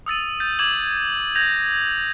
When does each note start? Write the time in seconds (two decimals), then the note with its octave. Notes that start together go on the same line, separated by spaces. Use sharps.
0.06 D#6 E6 A6 D#7
0.40 G6 A6
0.59 D6 G#6 F#7
1.35 G6 G#6 A#6 F7